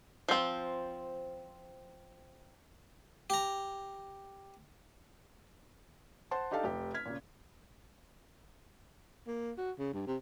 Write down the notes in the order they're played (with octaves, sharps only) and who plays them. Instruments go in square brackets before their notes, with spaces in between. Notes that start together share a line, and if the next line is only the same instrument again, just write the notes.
[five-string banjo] F3 C4
[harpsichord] G4 A#5
[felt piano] C5 F#5 A5 C6
D4 D#4 G4 A4 F5 A5
F1 G4
F6 G#6 B6
A#2 C#3
[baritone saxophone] A#3
F#4
C#3
G2
C3